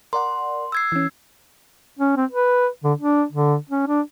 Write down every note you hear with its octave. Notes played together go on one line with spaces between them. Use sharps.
A#4 D5 F#5 C6
E6 G#6 C7
E3 C#4
C#4
C4
B4
D3
D4
D3
C#4
D4